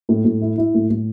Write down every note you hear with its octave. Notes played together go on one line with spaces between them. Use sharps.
A2
A2
E4
E4
A2
A2